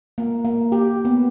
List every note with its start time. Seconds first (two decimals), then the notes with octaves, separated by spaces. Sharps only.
0.18 A#3
0.45 A#3
0.72 G4
1.05 B3